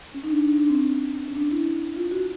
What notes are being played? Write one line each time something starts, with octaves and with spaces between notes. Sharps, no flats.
C#4
D#4
D4
D4
D4
C4
C#4
C#4
D4
E4
F4
F#4